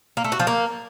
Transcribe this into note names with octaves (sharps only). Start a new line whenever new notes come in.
A#3
A3
F#4
F3
A#3